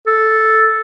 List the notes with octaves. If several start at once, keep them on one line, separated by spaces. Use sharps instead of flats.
A4